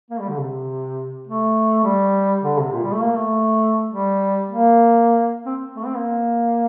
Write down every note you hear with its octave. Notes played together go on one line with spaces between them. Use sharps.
A#3
G3
D3
C3
A3
G3
D3
C3
A#2
G3
A3
A#3
A3
G3
A#3
C4
A3
C4
A#3